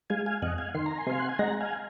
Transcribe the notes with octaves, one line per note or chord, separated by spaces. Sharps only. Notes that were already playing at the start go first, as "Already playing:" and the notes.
G#3 F5 G#5
F5 G#5
F2 D#5 F#5
F5 G#5
D#3 C6
A#5
G#5 C6
C3 F5
F#5
G#5
G#3 F#5 A#5
F5 G#5